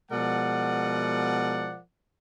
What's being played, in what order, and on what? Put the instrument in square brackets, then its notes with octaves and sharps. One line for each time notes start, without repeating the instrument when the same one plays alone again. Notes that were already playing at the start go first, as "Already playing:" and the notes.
[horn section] B2 F3 G#3 A#4 D5 F#5